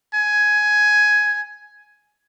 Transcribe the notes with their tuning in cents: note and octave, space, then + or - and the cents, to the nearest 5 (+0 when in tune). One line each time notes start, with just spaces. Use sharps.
G#5 +10